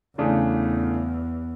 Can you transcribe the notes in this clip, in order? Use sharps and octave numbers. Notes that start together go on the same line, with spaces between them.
E2 C#3 E3 A3 D4